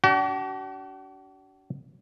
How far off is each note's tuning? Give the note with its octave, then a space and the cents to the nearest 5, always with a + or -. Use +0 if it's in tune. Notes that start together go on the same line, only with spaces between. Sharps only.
D4 -30 F#4 +45